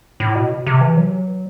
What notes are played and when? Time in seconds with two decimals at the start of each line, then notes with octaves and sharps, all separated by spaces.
0.20 A2
0.35 B2
0.66 C3
0.81 E3
0.97 F#3